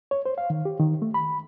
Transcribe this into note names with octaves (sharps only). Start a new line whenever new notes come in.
C#5
C5
F5
D#3
G4
D#3
A3
B5